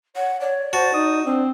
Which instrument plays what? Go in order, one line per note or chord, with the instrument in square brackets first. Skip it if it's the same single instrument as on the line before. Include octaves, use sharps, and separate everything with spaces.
[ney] C#5 [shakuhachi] F#5
[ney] C#5 [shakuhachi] D5
[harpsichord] F#4 [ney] C5 [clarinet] A5
[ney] D#4 [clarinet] D#6
[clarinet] C4 [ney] D4 [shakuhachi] C5